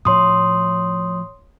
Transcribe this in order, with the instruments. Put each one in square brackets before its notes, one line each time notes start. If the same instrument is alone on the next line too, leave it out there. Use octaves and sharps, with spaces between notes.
[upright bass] A2 F3 [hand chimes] C#5 C6 D#6